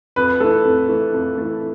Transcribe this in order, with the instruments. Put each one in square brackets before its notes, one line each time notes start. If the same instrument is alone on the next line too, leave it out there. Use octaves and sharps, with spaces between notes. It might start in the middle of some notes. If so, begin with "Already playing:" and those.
[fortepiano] F2 [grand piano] B4
[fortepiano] E3 A3 [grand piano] A4
[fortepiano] F2
E3 A3
F2
E3 A3